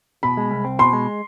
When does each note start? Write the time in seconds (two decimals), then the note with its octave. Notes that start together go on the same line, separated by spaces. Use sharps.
0.23 B2 B5
0.37 G#3
0.51 C2
0.64 C4
0.79 B2 C6
0.93 G#3